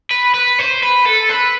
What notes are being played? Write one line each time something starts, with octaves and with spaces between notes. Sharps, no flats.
B4
B4
C5
B4
A4
B4